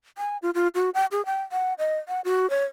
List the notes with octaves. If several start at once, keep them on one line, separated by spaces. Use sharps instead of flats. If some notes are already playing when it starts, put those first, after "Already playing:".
G#5
F4
F4
F#4
G5
G#4
G5
F#5
D#5
F#5
F#4
C#5